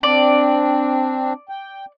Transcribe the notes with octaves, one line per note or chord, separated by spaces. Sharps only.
C4 D4 D5
G5